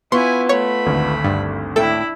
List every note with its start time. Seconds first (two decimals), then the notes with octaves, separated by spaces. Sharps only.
0.12 B3 E4 F4 G#5 C6 C#6
0.49 A3 C#5 B5
0.86 G#1 D2
1.24 G2
1.76 A2 D4 E4 A4 G5